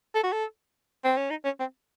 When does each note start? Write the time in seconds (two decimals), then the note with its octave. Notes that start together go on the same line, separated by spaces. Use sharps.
0.15 A4
0.23 F#4
0.32 A4
1.04 C4
1.17 C#4
1.30 D#4
1.44 C#4
1.60 C4